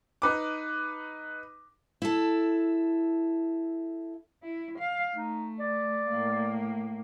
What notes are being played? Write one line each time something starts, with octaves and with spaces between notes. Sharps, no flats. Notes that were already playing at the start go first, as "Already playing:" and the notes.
D#4 B4 D6
E4 A4
E4
F5
A3 D#4
D5
A2 A#3